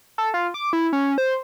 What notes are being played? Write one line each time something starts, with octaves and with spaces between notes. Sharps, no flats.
A4
F4
D6
E4
C#4
C5